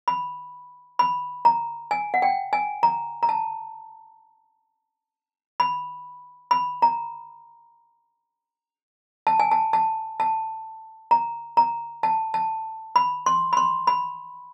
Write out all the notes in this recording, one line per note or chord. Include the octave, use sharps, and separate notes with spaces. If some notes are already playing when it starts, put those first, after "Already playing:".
B5
B5
A#5
G#5
F#5
G5
G#5
A#5
A#5
A5
B5
B5
A#5
A5
G#5
A5
A5
A5
A#5
A#5
A5
A5
B5
C6
B5
C6
B5